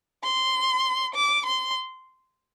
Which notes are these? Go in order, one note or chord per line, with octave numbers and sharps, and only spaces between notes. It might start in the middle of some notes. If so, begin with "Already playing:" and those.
C6
D6
C6